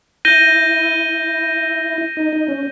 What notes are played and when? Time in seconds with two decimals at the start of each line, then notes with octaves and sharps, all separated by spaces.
0.25 E4 G6 A#6 D#7 G7
2.17 D#4
2.33 D#4
2.48 C#4